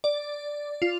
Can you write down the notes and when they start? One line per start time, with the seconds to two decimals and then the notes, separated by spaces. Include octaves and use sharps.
0.04 D5
0.82 F4